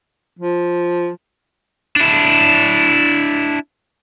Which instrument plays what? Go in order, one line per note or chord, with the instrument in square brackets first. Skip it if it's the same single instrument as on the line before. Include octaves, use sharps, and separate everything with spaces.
[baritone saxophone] F3
[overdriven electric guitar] D4 E4